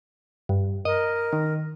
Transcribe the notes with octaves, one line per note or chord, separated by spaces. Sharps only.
G2
A#4 D#5
D#3